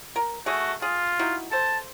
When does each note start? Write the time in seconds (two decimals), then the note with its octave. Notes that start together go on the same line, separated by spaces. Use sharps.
0.16 A#4
0.46 A3 F#4 G#4
0.82 F4 G#4
1.19 D#4 E4 F#4
1.51 A4 C5 A5